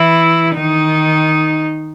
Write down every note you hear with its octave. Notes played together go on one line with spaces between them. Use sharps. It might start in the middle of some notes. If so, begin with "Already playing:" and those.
Already playing: E3 E4
D#3 D#4